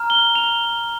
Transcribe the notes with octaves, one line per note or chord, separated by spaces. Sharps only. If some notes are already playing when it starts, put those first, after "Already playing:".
Already playing: A#5 F6
G7
F7